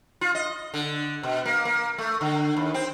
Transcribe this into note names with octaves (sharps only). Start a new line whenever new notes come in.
F4
D#5
D3
B2
A#3
A#3
A3
D3
D#2
C4